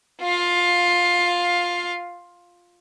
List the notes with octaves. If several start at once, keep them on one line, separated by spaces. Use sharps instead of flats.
F4 F5